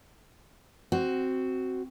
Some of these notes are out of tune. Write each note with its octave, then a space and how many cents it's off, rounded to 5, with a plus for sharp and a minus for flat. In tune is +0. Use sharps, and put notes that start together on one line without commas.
C4 +0 F#4 +10